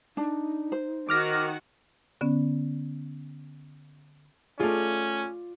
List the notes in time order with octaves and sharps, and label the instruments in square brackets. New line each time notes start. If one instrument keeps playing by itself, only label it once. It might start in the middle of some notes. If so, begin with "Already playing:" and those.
[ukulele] D4 [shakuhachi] D#4
[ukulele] C5
[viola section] D#3 F#4 F#5 [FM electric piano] D6 F6 A#6
[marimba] D3 B3 C#4
[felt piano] A3 G#4 [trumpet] C#4 [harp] F4 D5 F5